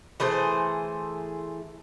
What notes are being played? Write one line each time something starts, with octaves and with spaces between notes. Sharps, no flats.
E3 A3 G#4 C5